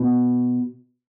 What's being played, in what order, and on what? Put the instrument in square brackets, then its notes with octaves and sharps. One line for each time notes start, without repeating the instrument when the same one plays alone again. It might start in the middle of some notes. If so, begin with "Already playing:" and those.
Already playing: [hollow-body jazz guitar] B2